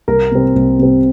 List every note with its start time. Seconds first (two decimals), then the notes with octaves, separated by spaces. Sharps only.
0.08 C2 A#4
0.31 C3 G3 C4
0.55 C2
0.79 C3 G3 C4